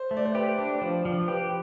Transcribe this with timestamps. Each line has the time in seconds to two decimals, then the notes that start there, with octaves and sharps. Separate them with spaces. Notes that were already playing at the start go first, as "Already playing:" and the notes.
Already playing: C5
0.11 A3
0.17 D5
0.26 C5
0.35 G4 B4
0.58 D4
0.81 F3 C5
1.05 F3
1.28 G4 B4